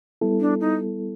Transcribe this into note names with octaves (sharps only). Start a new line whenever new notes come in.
G3 B3 E4 A4
D4
D#4